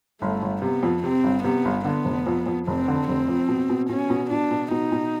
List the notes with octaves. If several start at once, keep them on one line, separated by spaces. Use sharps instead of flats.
G1 A3
G1
C3 B3
F2
C3 C4
G1
C3 B3
G1
D3 B3
F1
F2
F2
F1 C4
D3
F1 C4
F2
B2
B2
B2 C#4
B2
B2 D4
B2
B2 D#4
B2